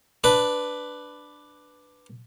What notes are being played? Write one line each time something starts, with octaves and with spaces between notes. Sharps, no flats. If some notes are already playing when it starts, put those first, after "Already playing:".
D4 B4